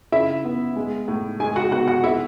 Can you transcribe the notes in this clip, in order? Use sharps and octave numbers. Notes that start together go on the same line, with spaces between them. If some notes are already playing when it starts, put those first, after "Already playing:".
C#3 E4 E5
B3
G#3
A2
G#3 G#4 G#5
F#4 F#5
B3 F#4 F#5
F#4 F#5
E4 E5